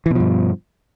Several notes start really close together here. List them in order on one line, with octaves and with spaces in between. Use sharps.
E3 B2 F3 G2